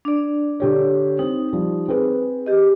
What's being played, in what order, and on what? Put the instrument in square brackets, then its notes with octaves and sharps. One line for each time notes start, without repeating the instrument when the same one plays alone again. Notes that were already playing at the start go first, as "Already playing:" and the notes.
[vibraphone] D4 D5
[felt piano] D3 G4 C#5
[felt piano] C4 [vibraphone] D#4
[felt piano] F3 G3
C4 G#4 B4
[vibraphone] G4 D#5